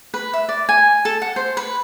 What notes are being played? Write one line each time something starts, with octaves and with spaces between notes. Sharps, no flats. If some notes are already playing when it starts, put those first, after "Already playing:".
B4
E5
D5
G#5
A4
F#5
C5
B4